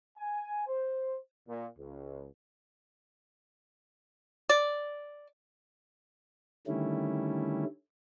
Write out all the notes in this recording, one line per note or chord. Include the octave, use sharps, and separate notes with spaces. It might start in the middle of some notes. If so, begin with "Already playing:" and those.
G#5
C5
A#2
C#2
D5
D3 D#3 G3 A3 C#4 E4